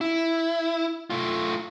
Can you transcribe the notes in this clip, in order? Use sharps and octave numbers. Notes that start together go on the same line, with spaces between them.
E4
A3 F4